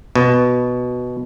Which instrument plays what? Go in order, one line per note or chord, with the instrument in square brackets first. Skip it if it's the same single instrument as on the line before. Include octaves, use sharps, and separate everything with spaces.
[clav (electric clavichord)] B2